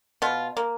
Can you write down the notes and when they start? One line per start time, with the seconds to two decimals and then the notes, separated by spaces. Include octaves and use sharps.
0.22 B2 F4
0.57 A#3